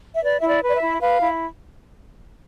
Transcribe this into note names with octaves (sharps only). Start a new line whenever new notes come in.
E5
B4 D5
E4 E5
D5
B4
D5
E5
E4
B4 F5
E4